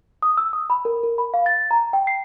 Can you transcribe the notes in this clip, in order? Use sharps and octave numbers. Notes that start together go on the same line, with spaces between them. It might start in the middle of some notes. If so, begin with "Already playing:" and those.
D#6
E6
D#6
B5
A#4
A#4
B5
F5
A6
A#5
G5
C7